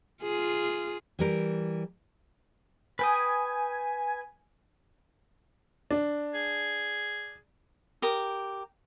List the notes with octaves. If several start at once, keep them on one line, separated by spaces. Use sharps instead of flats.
F4 G#4
E3 G3 A#4
B4 G5 G#5 D#6
D4
G#4
G4 A#4 D#6